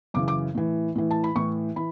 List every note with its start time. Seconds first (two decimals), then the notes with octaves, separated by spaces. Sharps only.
0.14 F#2 C#3 E3 D6
0.28 D6
0.55 A2 E3
0.95 A2 E3
1.11 A5
1.24 B5
1.36 A2 E3 C#6
1.76 E3 B5